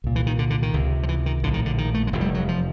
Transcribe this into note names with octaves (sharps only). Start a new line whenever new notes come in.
C2 A#2
E3
D#3
D3
D3
D#3
C#2 C3
F3
E3
D#3
A#1 A2 D3
D#3
D3
D#3
A3
G#3
F1 E2 C3
G3
F#3
F3